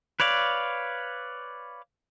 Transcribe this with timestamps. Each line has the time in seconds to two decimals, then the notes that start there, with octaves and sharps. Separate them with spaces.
0.20 B4 C#5 D5 F5